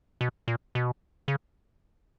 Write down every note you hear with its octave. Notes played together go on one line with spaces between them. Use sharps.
B2
A#2
B2
C#3